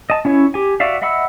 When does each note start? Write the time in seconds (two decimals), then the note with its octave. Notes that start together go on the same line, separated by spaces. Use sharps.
0.10 D#5 A5
0.25 C#4 E4 C#5
0.54 G4 G#5
0.80 F#4 D5 E5 F5
1.02 D#5 E5 F#5 B5 E6